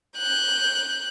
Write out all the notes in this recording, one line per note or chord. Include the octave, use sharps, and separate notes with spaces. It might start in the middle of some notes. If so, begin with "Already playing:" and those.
F#6 G6